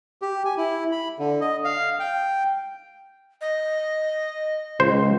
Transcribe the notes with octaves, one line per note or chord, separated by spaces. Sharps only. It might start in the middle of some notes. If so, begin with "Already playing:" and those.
G4
G#5
E4
B5
D3
D#5
F5
G5
D#5
C#2 C5